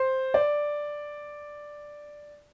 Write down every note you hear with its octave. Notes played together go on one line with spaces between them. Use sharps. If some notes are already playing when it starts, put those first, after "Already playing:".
Already playing: C5
D5